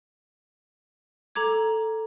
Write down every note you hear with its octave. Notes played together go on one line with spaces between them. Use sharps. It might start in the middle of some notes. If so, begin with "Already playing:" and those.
A4 A#5 D6 G#6